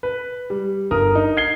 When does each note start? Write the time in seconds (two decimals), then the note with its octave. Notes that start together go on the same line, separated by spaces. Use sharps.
0.03 B4
0.50 G3
0.91 G1 A#4 D#6
1.15 D#4
1.37 G#6 C7 G7